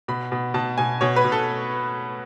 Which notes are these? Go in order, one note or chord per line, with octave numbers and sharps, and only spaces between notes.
B2 B5
B2
B2 A5
B2 G#5
B2 C#5
B4
B2
A4